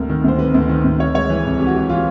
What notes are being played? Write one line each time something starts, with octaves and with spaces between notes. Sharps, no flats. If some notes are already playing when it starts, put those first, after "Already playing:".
Already playing: D2 C3 A#4
D#3
D2 C5
C3 B4
D2
D#3
D2
C3 C#5
G#3 C#5
E3 B4
C2
C3 G4
F#4
G#3 G4
E3 F4